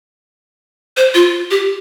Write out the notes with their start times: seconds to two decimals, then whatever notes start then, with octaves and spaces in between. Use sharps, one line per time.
0.97 C5
1.15 F4
1.51 G4